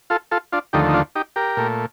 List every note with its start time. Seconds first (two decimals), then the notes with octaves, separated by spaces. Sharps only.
0.10 F4 A4
0.31 F4 A4
0.52 D4 F4
0.73 D#2 D3 F3 A3 D#4 G4
0.88 D#4
0.94 D4 F4
1.15 D#4 G4
1.36 G4 A#4
1.57 A#2 A3